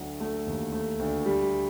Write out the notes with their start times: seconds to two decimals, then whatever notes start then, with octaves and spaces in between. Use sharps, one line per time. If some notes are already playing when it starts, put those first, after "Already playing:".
Already playing: D2 F#3
0.20 A3
0.47 D#2
0.72 A3
0.99 D2
1.25 G3